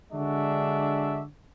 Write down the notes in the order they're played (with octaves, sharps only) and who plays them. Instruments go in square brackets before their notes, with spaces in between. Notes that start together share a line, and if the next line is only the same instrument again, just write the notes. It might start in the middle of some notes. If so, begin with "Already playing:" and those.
[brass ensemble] D3 G#3 D4 F#4 E5